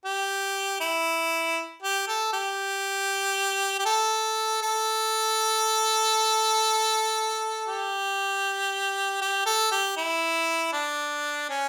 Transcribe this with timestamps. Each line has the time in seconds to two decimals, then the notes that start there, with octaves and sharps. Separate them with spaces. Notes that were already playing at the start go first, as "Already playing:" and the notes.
0.05 G4
0.80 E4
1.82 G4
2.08 A4
2.33 G4
3.79 G4
3.86 A4
4.62 A4
7.67 G4
9.21 G4
9.46 A4
9.71 G4
9.97 E4
10.73 D4
11.50 C#4